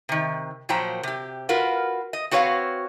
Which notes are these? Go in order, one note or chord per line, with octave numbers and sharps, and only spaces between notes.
C3 D#3
A#2 F3 F#3 C5 G5 A#5
C3 G4
F4 F#4 A#4 B4
D#5
C4 F#4 B4 C#5 D#5 F5